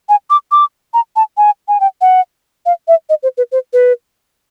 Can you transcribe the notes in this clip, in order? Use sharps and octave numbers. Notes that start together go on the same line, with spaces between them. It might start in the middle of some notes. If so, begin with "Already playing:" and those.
G#5
D6
D6
A#5
A5
G#5
G#5
G5
F#5
F5
E5
D#5
C5
B4
C5
B4